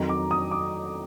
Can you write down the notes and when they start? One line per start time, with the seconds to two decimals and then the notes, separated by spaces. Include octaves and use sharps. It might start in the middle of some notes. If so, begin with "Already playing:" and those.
Already playing: F2 D#3 F#3 A#5
0.09 D6
0.31 D#6
0.51 D6